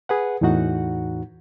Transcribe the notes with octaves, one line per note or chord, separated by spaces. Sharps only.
G#4 B4 F#5
E2 A2 E3 D#4 F#4 F#5